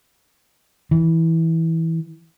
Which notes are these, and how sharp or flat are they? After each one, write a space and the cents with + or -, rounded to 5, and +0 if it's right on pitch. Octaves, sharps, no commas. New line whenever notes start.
E3 -15